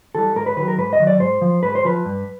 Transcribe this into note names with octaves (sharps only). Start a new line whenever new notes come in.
E3 G3 A4
G#2 A#4
B4
D#3 F#3 B4
A#4
G#2 B4
D#5
D#3 F#3
D5
G#2 C5
F3
G#2 B4
C5
F3 B4
G2